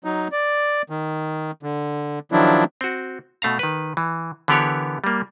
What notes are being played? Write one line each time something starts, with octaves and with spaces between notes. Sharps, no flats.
F#3 D#4
D5
D#3
D3
D#3 F3 F#3 D4 E4
C4 F#4
B2 A3 F5 A#5
D#3 B4
E3
D3 E3 B3 G4 A#4 C#5
G3 A#3